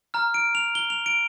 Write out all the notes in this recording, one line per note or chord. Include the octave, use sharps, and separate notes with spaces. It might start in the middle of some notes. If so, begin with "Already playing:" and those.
A#5 F6
D7
F7
G7
F7
D7